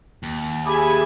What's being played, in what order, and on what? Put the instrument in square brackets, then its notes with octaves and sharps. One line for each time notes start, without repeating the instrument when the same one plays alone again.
[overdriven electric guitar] D#2
[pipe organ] G4 G#4 [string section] E5 G#5 [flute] B5